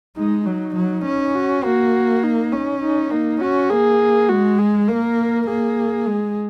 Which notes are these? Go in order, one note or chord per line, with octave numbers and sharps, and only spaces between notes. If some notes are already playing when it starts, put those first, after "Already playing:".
G#3 D#4
F#3 D#4
F#3
C#4
F#4
A#3 F#4
D#4
C#4
D#4
A#3 D#4
C#4 F#4
A#3 G#4
G#3 F#4
G#4
A#3 A#4
A#3 G#4
G#3